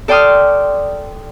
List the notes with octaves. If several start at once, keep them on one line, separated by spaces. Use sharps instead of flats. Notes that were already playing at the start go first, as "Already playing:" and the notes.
A4 D5 G5 C6 D#6 F6